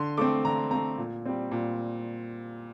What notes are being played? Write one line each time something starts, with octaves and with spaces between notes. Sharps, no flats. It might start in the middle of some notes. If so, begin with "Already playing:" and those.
Already playing: D3 C6
A3 C4 D6
D3 A#5
A3 C4 A#5
A#2
G3 C4
A#2